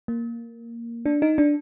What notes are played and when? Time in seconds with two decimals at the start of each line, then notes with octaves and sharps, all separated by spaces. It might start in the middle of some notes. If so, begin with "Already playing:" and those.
0.08 A#3
1.06 D4
1.22 D#4
1.38 D4